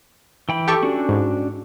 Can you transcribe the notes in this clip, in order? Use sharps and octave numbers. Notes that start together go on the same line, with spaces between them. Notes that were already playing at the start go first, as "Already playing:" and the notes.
E3 G5 B5
G4 A4 C#6
C#4 D4 F#4
G#2